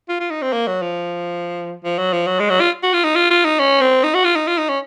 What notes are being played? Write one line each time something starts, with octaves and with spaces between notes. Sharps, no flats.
F4
F4
D#4
C4
A#3
F#3
F3
F3
F#3
F3
F#3
G#3
F#3
F4
F#4
F4
D#4
F4
F4
D#4
C#4
C4
D#4
F#4
F4
D#4
F4
D#4
C#4